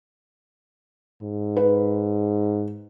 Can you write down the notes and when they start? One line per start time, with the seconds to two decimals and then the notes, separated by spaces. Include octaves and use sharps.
1.23 G#2
1.57 B4